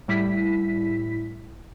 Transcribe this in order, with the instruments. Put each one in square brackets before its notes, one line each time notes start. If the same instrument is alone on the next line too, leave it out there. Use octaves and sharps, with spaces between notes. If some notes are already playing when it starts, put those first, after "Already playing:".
[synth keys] A2 G3 E4 B6